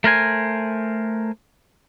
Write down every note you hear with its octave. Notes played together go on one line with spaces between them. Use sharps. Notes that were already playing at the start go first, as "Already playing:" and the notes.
A3 A#4 C5 G#5